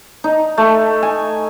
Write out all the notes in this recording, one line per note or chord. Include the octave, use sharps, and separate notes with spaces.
D#4
A3
G#5